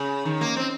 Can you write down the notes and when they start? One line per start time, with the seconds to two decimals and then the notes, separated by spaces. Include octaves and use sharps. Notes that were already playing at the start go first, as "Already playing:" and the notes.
Already playing: C#3
0.25 D#3
0.41 A#3
0.57 C4